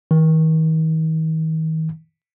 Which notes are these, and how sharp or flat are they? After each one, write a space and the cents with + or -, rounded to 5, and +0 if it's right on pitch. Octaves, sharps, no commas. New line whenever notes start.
D#3 +40